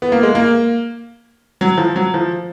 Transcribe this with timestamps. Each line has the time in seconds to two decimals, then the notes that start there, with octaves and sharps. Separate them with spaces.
0.02 B3
0.12 A#3
0.23 G#3
0.35 A#3
1.61 F#3
1.78 F3
1.96 F#3
2.14 F3